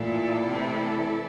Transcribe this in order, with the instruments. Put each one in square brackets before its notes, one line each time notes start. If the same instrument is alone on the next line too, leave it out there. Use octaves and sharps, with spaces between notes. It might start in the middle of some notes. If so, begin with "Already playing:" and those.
Already playing: [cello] A#2 [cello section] E3 A3 E4 A4 D5
[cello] C3